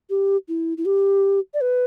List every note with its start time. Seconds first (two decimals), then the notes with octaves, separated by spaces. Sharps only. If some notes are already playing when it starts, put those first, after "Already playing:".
0.10 G4
0.48 E4
0.77 E4
0.86 G4
1.54 D5
1.62 B4